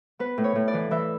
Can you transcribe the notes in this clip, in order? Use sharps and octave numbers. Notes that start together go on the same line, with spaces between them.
B3 B4
A2
C#5
A2
D5
E3
E3 E5